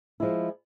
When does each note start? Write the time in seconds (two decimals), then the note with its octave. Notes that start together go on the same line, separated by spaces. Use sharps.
0.20 F3 G#3 E4